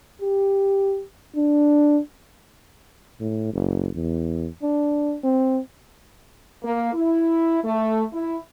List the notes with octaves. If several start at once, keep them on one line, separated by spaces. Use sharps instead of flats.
G4
D4
A2
F#1
E2
D4
C4
A#3
E4
A3
E4